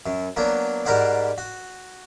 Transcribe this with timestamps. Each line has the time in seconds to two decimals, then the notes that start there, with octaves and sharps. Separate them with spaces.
0.06 F#2
0.36 F#3 A#3 B3 D4
0.85 G#2 G3 A#4 C5 F#5 D6
1.38 F#4